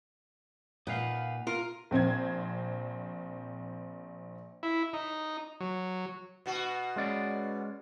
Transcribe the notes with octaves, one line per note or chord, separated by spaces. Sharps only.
A#2 D#4 B4 F5 F#5
F4 A#4
A#1 C4 C5 G#6
E4
D#4
F#3
B2 F#4
G#3 C#4 D5